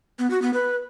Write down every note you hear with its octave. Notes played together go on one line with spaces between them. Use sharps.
B3
F#4
B3
B4